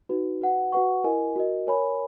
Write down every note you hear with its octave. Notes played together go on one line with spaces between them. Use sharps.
D#4 F#4 B4
F#4 B4 F#5
F#4 B4 F#5 C#6
E4 A#4 D#5 G#5
F#4 A#4 D#5
A#4 C#5 G#5 B5